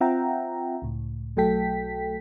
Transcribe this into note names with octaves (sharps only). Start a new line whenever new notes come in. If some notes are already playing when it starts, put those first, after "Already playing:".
C4 F4 E5 F#5 G5 A#5
C#2 A2
B1 F#3 A3 A4 G5 B6